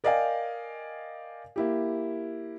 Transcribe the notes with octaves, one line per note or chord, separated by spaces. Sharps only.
A#4 D5 D#5 F5 G5 G#5
A#3 E4 G4